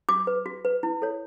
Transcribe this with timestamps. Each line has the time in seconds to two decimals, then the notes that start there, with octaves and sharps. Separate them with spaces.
0.09 F#4 D6
0.27 B4
0.46 F#4
0.65 B4
0.83 E4
1.02 A4 C#5